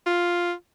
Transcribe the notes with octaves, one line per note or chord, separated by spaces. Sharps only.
F4